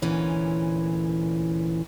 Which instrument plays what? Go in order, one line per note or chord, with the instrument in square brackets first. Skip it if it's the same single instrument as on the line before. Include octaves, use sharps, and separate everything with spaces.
[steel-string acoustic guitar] D2 A#2 E3 C#4